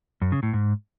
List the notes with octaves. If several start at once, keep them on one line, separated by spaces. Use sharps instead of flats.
F#2
C#3
A2
G#2